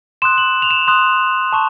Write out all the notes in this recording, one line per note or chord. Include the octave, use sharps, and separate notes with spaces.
C6 D#6 F#6 E7
F#7
F7
E7
C6 D#6 F#6
A5 C#6